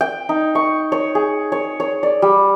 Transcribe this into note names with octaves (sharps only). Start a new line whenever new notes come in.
G5
D#4
C#6
C#5
G#4
C#5
C#5
D5
G3